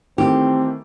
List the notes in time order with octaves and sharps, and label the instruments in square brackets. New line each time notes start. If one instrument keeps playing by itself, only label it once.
[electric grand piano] D#3 E3 A3 [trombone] C4 [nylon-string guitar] G4